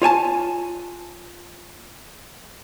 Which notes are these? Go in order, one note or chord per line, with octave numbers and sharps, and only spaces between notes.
F4 C#5 G#5 A5